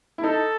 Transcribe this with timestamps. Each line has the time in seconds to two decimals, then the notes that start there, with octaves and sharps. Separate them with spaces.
0.18 E4
0.23 D#4 A4